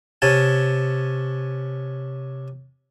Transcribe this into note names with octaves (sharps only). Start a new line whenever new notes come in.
C3 C#4 G#5 A5